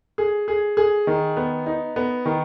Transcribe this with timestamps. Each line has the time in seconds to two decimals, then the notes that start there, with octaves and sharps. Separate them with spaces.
0.18 G#4
0.48 G#4
0.77 G#4
1.07 D#3
1.37 B3
1.66 D#4
1.96 B3
2.26 D#3